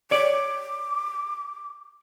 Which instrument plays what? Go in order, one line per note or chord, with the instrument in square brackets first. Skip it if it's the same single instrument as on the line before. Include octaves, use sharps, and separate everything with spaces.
[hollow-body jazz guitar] C#5 D5 [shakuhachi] D6